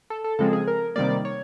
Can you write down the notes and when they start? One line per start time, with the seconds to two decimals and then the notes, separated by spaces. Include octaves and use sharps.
0.10 A4
0.24 A4
0.39 C#3 F3 G#3 C4 A4
0.53 G#4
0.67 A#4
0.96 C3 D#3 G3 A#3 D5
1.25 C#5